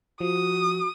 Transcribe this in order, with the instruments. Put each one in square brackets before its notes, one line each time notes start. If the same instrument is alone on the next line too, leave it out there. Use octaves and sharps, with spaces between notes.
[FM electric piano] F3 [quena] F#4 [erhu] D#6